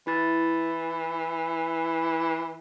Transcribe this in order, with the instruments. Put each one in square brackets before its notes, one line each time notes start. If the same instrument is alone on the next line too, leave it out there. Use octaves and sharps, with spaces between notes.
[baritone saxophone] E3 [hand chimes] E4 A6